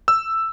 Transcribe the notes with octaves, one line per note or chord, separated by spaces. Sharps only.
E6